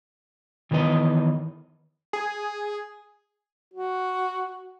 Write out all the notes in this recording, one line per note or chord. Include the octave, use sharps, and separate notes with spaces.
D#3 E3 B3 B4 D#5
G#4
F#4